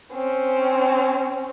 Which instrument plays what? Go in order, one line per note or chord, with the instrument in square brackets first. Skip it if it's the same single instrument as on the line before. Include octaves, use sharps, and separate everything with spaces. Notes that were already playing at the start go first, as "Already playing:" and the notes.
[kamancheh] C4 C#4